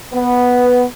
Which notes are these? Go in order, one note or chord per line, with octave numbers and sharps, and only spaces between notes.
B3